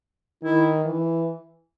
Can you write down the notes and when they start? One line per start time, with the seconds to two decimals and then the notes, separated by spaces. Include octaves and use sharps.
0.43 D#3 E4
0.85 E3